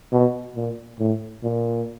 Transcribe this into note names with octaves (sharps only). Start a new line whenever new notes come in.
B2
A#2
A2
A#2